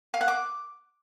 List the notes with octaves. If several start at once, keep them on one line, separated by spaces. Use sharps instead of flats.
F5
F#5
D6